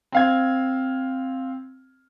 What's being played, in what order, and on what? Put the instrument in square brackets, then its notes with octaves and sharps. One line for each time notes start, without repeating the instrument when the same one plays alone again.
[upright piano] C4 F5 G#6